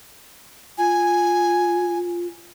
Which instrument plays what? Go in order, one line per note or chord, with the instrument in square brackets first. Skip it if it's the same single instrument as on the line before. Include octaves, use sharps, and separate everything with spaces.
[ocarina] F4 [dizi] G#5